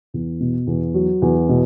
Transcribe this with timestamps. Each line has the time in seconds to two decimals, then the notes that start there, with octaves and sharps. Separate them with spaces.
0.14 E2
0.40 B2
0.67 E2
0.94 F#3
1.22 E2
1.49 B2